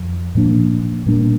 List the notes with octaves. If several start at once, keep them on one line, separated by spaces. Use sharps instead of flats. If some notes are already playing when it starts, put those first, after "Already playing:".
Already playing: F2 F3
A#2 F3 A#3 D4
A#2 G3 A#3 D4